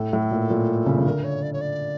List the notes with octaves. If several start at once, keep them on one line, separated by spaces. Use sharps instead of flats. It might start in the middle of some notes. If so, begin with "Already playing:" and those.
Already playing: A2 A4
A2
A#2
A#2
C#3
C#3
D3 A#4
C#5
D5
C#5
D5